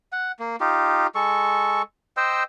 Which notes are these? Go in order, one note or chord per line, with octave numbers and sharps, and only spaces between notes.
F#5
A#3
D#4 F4 G4
G#3 A4 C#6
C5 D#5 G5 E6